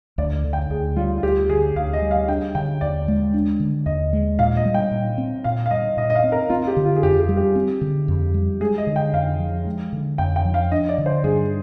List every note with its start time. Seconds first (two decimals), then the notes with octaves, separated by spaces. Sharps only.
0.18 D2 D5
0.44 D3
0.53 G5
0.70 D2 G#4
0.96 G3 F4
1.18 F4
1.23 D2 G4
1.49 D3 G#4
1.76 D2 F5
1.93 D#5
2.02 G3
2.11 F5
2.28 D4 G5
2.55 D3 G5
2.81 D#2 D5
3.08 G#3
3.34 D4
3.60 D3
3.86 D#2 D#5
4.13 G#3
4.39 A#2 F5
4.57 D#5
4.65 G3
4.74 G5
4.91 A#2
5.18 C4
5.44 A#2 F5
5.66 F5
5.71 G3 D#5
5.97 A#2 D#5
6.10 D#5
6.15 F5
6.24 C4
6.32 A#4
6.50 C4 F4
6.63 F4
6.68 G4
6.77 D3
6.85 F4
6.96 G#4
7.03 F2 G4
7.20 G4
7.29 G3
7.37 G4
7.56 C4
7.81 D3
8.08 F2
8.34 G3
8.60 G#3 G#4
8.78 D#5
8.87 D3
8.96 G5
9.13 F2 F5
9.39 F3
9.66 G#3
9.92 D3
10.18 F2 G5
10.36 G5
10.45 F3
10.54 F5
10.72 D4 D#5
10.89 D5
10.98 D3
11.06 C5
11.24 G2 G#4